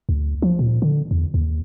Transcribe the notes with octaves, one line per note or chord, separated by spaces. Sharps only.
D2
F3
A#2
D3
E2
D#2